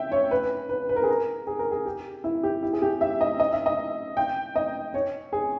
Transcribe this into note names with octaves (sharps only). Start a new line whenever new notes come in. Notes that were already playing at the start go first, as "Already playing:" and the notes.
Already playing: E5 G5
C#5
B4
B4
B4
A#4
G#4
A#4
G#4
A#4
G#4
G4
E4
G4
E4
G#4
G4
E5
D#5
D#5
E5
D#5
G5
D#5
C#5
G#4